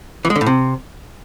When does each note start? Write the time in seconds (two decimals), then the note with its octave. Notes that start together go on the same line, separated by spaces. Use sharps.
0.25 E3
0.30 G#3
0.36 D3
0.41 A2
0.46 C3